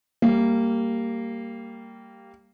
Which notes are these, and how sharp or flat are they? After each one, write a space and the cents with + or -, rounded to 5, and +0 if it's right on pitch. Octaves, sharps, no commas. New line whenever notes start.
G3 +0 A#3 -15